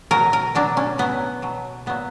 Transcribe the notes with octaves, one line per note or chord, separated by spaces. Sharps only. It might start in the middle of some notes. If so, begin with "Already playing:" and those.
B2 F#3 A#4
A#4
B2 F#3 D4
C#4
B2 F#3 B3
B2 F#3
A#2 F#3 B3